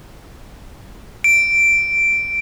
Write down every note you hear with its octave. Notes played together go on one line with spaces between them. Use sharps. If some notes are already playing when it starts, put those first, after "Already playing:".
D7